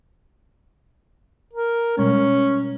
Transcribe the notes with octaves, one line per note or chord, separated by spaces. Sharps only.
A#4
B2 G3 G#3 C#4